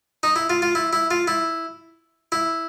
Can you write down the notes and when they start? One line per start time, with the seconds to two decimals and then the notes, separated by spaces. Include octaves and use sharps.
0.23 D#4
0.36 E4
0.50 F4
0.62 F4
0.75 E4
0.93 E4
1.11 F4
1.28 E4
2.32 E4